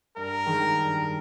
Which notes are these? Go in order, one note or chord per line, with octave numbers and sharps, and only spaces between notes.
G2 A#4
D#3 G#3
G2